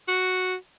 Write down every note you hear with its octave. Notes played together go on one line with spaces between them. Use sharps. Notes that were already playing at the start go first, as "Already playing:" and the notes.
F#4